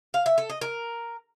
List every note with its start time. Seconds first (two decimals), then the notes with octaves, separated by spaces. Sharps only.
0.14 F5
0.26 E5
0.38 A4
0.50 D#5
0.61 A#4